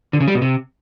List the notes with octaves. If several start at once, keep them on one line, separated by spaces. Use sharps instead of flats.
D3
C#3
G3
B2
C3